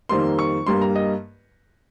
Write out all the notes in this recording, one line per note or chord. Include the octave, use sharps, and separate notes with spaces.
F2 D#3 G3 A#3 C6
C#6
G2 G3 A#3 C6
A#5
D#5